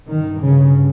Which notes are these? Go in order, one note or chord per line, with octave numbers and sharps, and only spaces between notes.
G2 D#3
C#3